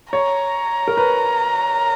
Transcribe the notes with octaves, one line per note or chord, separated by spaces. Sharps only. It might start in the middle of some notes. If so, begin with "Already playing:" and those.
C#5 A#5
A#4
B4